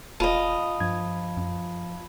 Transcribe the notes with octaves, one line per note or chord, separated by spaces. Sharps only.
E1 F4 D#5 A5 B5
G2 F3 G#6
F#2